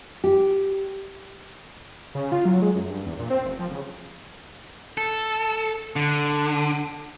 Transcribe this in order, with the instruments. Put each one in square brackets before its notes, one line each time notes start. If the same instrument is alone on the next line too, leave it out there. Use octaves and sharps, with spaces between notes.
[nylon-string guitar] G4
[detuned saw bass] C#3
F4
F#3
G#3
F#2
G2
E2
A#2
C4
F1
F3
C#3
[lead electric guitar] A4
D3